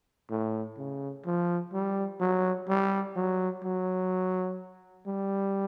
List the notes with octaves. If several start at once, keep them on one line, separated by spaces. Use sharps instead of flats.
A2
C#3
F3
G3
F#3
G3
F#3
F#3
G3